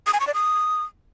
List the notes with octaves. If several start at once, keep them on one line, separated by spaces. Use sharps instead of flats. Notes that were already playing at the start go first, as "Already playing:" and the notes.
D#6
G#5
C#6
D5
D#6